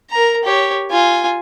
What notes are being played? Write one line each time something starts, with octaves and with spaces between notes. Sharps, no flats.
A#4 A#5
G4 C#5
F4 G#5